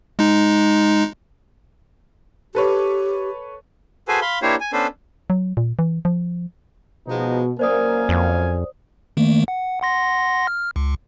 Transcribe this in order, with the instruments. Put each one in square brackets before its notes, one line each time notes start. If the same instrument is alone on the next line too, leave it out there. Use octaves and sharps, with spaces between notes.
[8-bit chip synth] G#3 D#4
[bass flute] G4 [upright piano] A4 B4 C#5
[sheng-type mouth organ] F#4 G#4 A4 B4 C5 G#5
F5 B5 C6
A#3 D4 E4 G4 C5 C#5
G#5
B3 C#4 D4 A4 B4 C5
[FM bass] F#3
A#2
E3
F3
[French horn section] B2 [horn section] F3 G#3 D#4
[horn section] F#2 F5 G#5 [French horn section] A#3 [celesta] C5 D5 D#6
[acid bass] F2
[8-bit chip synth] D#3 A3 A#3
F#5
F#5 C6 A#6
F6
C#2